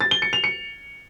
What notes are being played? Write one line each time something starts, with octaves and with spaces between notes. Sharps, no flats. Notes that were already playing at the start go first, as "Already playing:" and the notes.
A6
G7
C#7
F7
C#7